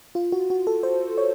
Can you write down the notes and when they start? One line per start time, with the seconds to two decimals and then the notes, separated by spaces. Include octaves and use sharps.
0.15 F4
0.32 F#4
0.50 F#4
0.67 A4
0.83 C5
1.18 C#5